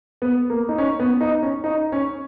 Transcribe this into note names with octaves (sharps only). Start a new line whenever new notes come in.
B3
A#3
D#4
C#4
B3
D#4
C#4
D#4
C#4